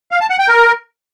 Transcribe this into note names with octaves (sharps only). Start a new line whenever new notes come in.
F5
A5
F#5
G5
A#4